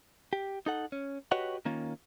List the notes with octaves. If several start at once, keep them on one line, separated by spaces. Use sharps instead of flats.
G4
D#4 A4 F#5
C#4
F#4 G4 B4 C#5 D#5 F#5
D#3 A#3 C#4 F4